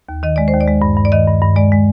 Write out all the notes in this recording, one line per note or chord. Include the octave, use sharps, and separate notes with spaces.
D#2
D#3 D#5
G#3 D5
C5
D#2
D5
G#3
G2
G2
D5
D#3 D#5
G2
G2
G#3 D5
G#3